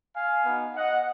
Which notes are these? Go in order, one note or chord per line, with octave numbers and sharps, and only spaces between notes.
F5 G#5
B3 D#4 F#4
D#5 F#5